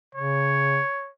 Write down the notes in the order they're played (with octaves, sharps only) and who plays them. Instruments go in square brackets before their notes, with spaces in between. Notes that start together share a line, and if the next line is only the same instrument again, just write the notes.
[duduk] C#3 [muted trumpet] C#5